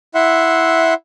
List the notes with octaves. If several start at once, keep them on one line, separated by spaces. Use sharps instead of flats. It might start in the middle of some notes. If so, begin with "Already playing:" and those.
E4 E5 F#5 C6